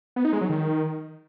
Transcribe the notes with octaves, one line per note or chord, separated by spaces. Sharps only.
B3
D#4
G#3
F#3
D#3